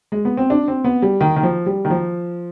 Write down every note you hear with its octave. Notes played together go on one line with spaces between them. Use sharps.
G#3
B3
C4
D4
C4
B3
G3
D#3
D#3
F3
G3
D#3
F3